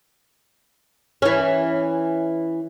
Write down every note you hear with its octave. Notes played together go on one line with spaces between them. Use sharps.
E3 C#4